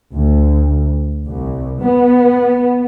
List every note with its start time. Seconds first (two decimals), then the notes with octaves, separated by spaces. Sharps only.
0.13 D2
1.25 C2
1.81 B3